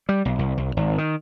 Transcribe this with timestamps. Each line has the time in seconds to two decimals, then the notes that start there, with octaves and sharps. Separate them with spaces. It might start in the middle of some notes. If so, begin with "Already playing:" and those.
0.09 G3
0.25 B1
0.39 C2
0.58 C2
0.77 G#1
0.98 D#3